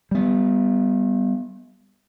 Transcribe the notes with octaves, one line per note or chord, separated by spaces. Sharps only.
G3 B3